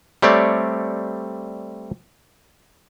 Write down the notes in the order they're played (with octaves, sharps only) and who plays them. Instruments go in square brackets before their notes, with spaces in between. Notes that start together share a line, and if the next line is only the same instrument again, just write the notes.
[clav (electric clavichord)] G3 A3 C4 C#5 D5